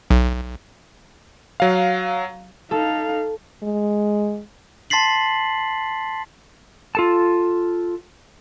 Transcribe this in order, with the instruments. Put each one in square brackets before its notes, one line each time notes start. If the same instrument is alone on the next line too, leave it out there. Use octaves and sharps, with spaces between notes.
[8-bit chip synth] B1
[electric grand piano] F#3 F5
[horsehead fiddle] D#4 F5 [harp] A4
[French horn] G#3
[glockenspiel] A5 C6 A6 B6 C7 F#7
[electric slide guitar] F4 A4 A5